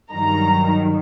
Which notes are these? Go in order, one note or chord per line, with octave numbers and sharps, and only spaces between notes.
G2 D#3 F#3 A#5